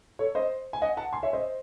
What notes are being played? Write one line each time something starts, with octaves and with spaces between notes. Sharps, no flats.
A4 C#5
C5 D#5
G#5
D#5 F#5
F#5 A5
G#5 C6
C#5 E5
C5 D#5